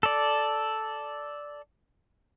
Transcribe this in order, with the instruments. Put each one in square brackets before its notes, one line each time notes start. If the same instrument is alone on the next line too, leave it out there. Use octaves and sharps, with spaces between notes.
[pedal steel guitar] A4 D5